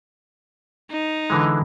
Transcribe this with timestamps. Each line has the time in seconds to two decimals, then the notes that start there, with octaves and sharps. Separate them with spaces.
0.91 D#4
1.30 D3 E3 G#3